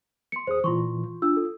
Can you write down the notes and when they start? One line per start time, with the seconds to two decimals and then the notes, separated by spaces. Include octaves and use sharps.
0.32 C6 C#7
0.47 D#2 G#4 C5 D#6
0.64 A#2 E3 F4 C6 C#6
1.22 D4 F4 E6
1.37 A4